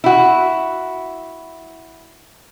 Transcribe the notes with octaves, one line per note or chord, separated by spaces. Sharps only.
E4 F#4